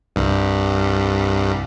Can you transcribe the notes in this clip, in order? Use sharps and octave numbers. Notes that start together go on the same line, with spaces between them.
C2 G2